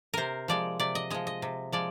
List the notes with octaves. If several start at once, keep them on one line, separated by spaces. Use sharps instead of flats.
C3 A#4 C5
F3 G#3 D5
C3 D5
D#5
F3 G#3 D#5
D#5
C3
F3 G#3 D5